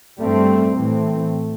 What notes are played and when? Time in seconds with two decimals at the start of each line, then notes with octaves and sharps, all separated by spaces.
0.19 G2 G3 A3 C4
0.74 A2 E3 A3 C4